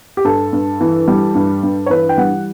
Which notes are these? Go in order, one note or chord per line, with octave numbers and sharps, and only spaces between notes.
G4
G2 A4
G2
E3
G3
G2
G2
C#5
E3 B4
G5
G3 F#5